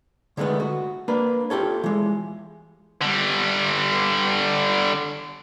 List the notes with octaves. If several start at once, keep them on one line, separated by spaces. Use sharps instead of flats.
D3 D#3 G#3 A3 B3
F#4
A#3 D4 B4
F4 G4 A4 C#5
E3 G#3
D3 G3